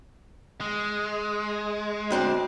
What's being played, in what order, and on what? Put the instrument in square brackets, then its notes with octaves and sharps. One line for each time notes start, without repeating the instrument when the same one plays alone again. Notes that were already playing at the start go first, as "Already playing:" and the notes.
[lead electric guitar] G#3
[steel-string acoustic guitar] D2 C4 D4